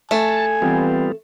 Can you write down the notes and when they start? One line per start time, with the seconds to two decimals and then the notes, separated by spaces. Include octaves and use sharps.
0.11 A3 G#5 A5
0.62 E3 G3 B3 C4 F4